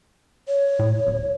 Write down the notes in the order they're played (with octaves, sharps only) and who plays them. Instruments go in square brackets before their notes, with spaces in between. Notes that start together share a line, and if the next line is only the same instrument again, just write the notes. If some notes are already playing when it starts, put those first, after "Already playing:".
[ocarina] C#5
[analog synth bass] A2
D1